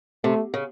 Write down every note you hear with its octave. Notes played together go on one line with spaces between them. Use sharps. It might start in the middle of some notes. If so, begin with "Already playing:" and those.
C3 A3
C#3